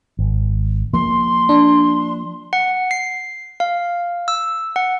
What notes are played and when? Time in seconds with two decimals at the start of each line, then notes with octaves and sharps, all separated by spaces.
0.19 G#1
0.93 F3 A#3 C6
1.49 D4
2.53 F#5
2.91 C7
3.60 F5
4.28 E6
4.76 F#5